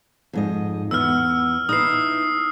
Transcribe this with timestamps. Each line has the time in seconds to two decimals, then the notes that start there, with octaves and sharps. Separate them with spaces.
0.33 F2 G#2 D#5
0.91 E2 B3 E6 F6
1.69 D#4 E4 B4 D#6 C7